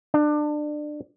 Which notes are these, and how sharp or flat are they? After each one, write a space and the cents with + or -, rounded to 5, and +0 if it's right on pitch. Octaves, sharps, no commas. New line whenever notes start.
D4 +25